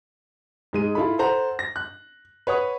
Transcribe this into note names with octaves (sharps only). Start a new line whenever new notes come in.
G#2 G#3 D#7
E4 F4 A4 B5
A4 C5 F#5 A#5
A#6
F#6
B4 C#5 F#5 D#6